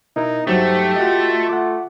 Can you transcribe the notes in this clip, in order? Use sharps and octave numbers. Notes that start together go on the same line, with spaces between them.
B2 D#4 E4 A#4
G2 F#3 A3 D#4 G4 C5
F4 F#4 D#5
A3 F#5 D6